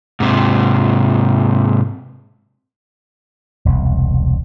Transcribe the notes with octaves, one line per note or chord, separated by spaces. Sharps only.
G#2 C3
E1 C2